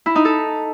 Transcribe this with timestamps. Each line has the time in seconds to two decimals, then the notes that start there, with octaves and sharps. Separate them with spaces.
0.06 E4
0.15 D#4
0.25 A4